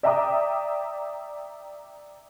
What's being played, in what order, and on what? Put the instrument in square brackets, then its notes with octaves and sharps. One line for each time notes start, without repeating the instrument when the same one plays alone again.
[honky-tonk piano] D5 E5 G5 A#5 D6 D#6